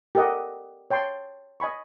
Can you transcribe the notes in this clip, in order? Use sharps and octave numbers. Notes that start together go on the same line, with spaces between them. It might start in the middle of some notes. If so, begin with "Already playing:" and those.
G4 A4 A#4 D#5 F#5
C#5 G5 A5 C6
D#5 G#5 B5 C#6